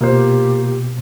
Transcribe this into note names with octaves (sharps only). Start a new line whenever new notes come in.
B2 A#3 F4 G4 C5